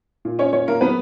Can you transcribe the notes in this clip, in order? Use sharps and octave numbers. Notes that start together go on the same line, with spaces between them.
A#2
C#4 C#5
A#2 C#4 C#5
A#3 A#4
F#3 B3 B4